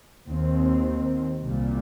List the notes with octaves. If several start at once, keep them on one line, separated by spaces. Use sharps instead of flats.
D#2 D#3 C4
C2 A#2 G3